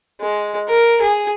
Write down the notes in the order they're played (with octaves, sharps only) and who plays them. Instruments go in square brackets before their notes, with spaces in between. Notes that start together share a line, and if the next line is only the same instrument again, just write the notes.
[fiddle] G#3
A#4
G#4